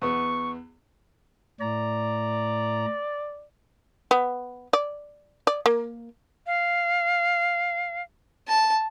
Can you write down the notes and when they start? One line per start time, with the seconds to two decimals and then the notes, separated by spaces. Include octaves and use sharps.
0.02 E2 B3 C#6
1.60 A2 D5 A#5
4.11 B3
4.73 D5
5.47 D5
5.66 A#3
6.47 F5
8.48 A5